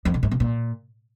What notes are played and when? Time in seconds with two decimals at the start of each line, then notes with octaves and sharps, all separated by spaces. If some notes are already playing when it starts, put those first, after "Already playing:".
0.05 F2
0.14 B2
0.23 G#2
0.31 B2
0.40 A#2